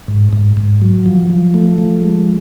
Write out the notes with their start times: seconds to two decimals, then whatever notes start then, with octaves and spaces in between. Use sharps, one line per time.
0.08 G#2
0.33 G#2
0.57 G#2
0.82 F#3
1.06 F3
1.30 F3
1.54 A3
1.78 F3
2.02 G#3